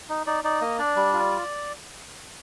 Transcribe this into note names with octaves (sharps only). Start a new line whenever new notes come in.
D#4
D#4 D5
D#4 D5
A#3 D#5
D4 D5
G3
F4